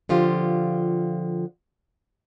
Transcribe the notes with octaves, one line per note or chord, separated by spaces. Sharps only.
D3 F3 F4 G4